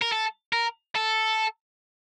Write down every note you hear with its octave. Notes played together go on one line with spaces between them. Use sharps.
A#4
A4
A#4
A4